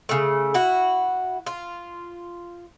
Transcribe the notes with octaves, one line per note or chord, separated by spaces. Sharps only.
C#3 A3
E4 F#4
F4